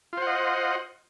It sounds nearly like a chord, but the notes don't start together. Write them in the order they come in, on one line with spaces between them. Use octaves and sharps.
F4 C5 F#5 D#5